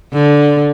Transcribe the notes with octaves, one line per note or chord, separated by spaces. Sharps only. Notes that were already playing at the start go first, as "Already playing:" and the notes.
D3